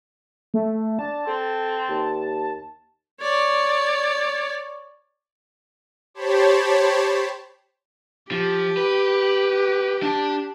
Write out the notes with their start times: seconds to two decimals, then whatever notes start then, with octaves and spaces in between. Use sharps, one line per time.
0.54 A3
0.99 D4 A5
1.27 C4 A4
1.89 D#2
3.21 C#5 D5
6.14 G4 C5 C#5 A5 B5
8.32 F3 G4
8.77 B4
10.03 D4 A5